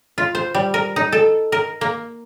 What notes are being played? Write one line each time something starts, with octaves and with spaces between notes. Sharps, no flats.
F4
C5
G3
A#4
D#4
A4
A#4
A#3